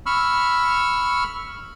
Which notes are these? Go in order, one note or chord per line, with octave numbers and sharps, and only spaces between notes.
B5 C#6 E6 F6